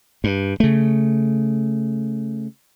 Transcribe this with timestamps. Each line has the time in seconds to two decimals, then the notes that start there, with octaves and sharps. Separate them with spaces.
0.24 G2
0.60 C#3 A3